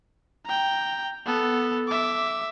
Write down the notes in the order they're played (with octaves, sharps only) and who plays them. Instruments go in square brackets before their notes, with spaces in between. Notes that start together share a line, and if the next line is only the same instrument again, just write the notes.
[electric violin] G5 A#5
B3 A4
E5 D6